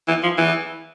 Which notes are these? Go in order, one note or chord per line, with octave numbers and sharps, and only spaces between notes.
E3
F3
E3